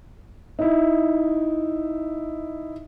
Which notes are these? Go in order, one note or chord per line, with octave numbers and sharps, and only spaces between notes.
D#4 E4